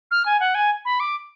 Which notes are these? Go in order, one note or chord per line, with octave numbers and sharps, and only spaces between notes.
F6
G#5
F#5
G#5
B5
D6